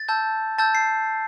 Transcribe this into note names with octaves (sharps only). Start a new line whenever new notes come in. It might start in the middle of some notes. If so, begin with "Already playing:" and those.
Already playing: A6
A5 E6 G6
A5 E6 G6 A6
C7